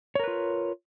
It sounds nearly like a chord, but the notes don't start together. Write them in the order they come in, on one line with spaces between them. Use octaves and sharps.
C#5 A#4 B4 F4